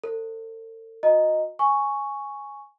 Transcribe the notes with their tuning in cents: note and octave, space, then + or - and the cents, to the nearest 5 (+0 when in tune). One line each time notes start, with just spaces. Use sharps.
A4 +40 C5 +35
F#4 -40 D#5 +0 A#5 +0
G#5 +0 C#6 +0